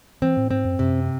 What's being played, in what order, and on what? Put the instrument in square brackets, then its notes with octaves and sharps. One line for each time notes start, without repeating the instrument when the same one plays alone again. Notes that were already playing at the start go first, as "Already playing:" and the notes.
[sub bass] E3 [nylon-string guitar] C4
[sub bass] A2
[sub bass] G#2 [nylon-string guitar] C4
[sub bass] F#2
[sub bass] F#2 [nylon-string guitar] C3